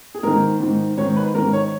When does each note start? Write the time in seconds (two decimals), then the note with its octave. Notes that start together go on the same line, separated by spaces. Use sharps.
0.15 G#4
0.23 G#2 D#3 A#4
0.60 G#2 D#3
0.97 G#2 D#3 C#5
1.16 B4
1.35 G#2 D#3 A#4
1.53 C#5